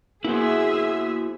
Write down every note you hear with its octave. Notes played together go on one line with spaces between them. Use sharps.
A#3 B3 E4 F#4 G#4 C5 E5